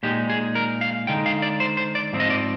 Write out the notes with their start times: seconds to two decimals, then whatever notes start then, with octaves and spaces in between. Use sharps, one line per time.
0.03 A#2 G#3 D#4 G4
0.30 G#4
0.55 A#4
0.81 F5
1.07 D3 G#3 D#4 G5
1.26 F5
1.42 D5
1.60 C5
1.77 C5
1.95 D5
2.13 G#2 F3 C4
2.20 D#5
2.30 D5